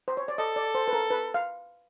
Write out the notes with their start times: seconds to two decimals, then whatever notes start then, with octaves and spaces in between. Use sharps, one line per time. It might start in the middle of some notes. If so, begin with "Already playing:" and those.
0.08 C5
0.17 C#5
0.28 D5
0.38 A4 D#5
0.56 D5
0.75 C5
0.88 B4
0.93 A#4
1.11 B4
1.34 F5